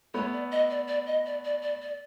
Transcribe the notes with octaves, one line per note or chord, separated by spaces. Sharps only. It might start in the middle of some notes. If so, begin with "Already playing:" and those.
A3 B3 C#5
D5
D#5
D5
D5
D#5
D5
D5
D5
D5